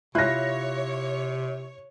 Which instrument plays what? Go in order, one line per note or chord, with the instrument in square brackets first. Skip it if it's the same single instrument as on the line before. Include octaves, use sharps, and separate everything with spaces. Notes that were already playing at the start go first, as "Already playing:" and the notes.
[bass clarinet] C3 [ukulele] E4 F4 [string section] C#5 [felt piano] F#6 A#6